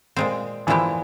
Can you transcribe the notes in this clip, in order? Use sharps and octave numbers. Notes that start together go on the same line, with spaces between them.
A#2 G#3 C4
A#2 E3 F3 G#3 E4 G4